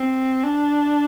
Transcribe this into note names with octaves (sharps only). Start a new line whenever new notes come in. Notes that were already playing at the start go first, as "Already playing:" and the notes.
Already playing: C4
D4